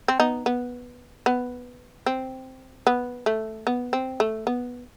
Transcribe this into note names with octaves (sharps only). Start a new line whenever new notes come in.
C4
B3 D#4
B3
B3
C4
B3
A3
B3
C4
A3
B3